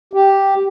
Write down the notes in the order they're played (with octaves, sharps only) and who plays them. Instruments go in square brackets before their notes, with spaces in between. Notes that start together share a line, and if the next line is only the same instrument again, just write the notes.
[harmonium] G4